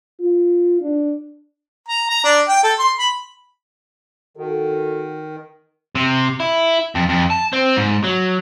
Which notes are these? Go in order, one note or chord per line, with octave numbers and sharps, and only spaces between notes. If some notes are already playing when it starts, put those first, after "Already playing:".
F4
D4
A#5
A#5
D4
G5
A4
C6
B5
D#3 F#4 A4
C3
E4
F2
F2
A5
C4
G#2
F#3